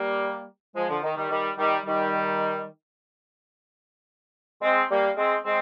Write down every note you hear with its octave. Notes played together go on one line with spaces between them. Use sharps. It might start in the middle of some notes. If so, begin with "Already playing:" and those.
Already playing: G3 A#3
F3 G#3
D3 F3
D#3
D#3 G3
D#3 G3
D#3 G3
D#3 G3
G#3 C4
G3 A#3
G#3 C4
G#3 C4